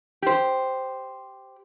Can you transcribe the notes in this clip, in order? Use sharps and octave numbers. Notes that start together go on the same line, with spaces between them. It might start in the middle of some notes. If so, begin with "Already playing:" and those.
G4 C5